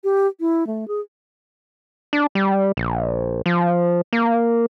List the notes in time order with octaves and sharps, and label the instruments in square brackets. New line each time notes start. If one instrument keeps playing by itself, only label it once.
[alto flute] G4
E4
A3
G#4
[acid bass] D4
G3
A#1
F3
A#3